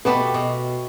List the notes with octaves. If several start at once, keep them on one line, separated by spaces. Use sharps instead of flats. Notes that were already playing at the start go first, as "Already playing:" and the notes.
B2 A3 B3 G4 B4
B2